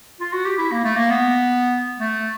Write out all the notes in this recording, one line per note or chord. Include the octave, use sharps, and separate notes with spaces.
F4
F#4
G4
E4
A#3
A3
A#3
B3
A3